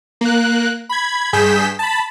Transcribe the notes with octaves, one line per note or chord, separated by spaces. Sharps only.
A#3 F#6
B5 G#6
G2 G#4 G6 B6 E7
A5 B5